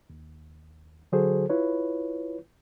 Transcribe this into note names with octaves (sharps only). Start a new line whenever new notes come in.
D#2
D3 F#3 F#4 G#4 A4 C5
E4 F4 B4 C#5